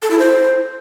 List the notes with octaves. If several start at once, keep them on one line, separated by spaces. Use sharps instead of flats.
A4
E4
C5